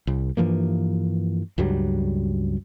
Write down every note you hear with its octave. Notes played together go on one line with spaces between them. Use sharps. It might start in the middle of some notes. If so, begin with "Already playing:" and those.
C2
G2 E3 F3 A#3
C#2 G2 F#3 G3